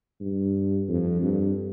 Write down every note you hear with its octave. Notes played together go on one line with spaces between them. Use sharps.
G2
F2
G2